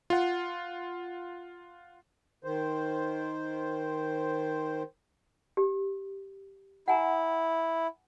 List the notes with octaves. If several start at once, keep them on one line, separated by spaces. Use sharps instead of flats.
F4 F#5
D#3 C5
G4
E4 F#5 G#5 A#5